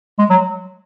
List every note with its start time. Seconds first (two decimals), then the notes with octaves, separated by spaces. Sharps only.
0.19 G#3
0.30 F#3